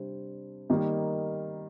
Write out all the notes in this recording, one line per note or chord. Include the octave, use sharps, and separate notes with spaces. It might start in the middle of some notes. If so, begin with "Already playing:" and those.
Already playing: C3 G3 D4 C5
D#3 G3 A#3 D#4